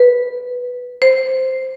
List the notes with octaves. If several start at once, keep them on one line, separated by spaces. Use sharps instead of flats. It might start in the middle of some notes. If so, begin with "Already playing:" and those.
Already playing: B4
C5